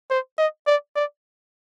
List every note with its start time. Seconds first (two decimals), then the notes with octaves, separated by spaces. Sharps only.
0.10 C5
0.38 D#5
0.67 D5
0.96 D5